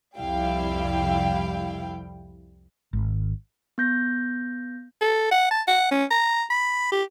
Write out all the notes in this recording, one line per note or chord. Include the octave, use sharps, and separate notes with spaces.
C2 F2 G3 E4 F5 G5
G#1
B3 G6 A#6
A4
F#5
A5
F#5
C#4
A#5
B5
G4